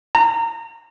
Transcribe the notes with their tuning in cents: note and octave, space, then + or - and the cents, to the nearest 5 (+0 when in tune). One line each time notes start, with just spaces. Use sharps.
A#5 -20